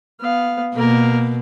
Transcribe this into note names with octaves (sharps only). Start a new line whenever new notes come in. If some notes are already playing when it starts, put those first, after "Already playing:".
B3 F5
B2 A#3 A#4